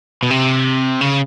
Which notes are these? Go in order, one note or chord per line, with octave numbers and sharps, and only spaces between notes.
B2
C3
C#3